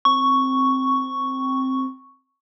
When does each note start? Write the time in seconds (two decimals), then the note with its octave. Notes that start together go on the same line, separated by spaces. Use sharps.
0.05 C4 C#6